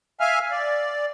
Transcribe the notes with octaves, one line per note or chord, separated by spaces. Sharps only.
E5 F5 G#5 F6
D5